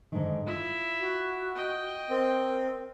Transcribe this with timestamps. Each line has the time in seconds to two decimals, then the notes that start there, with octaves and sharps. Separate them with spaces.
0.12 G#2 D3 D#3
0.47 E4 F4 E5
1.00 F#4
1.56 D#5 G5
2.10 C4 A#4